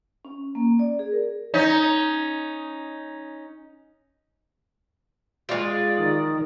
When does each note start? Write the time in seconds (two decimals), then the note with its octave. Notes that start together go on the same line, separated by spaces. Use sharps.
0.25 C#4
0.55 A#3
0.79 D5
0.99 G#4
1.12 A#4
1.54 C#4 D#4
5.49 G#3 F4 D5
5.97 D#3 D#6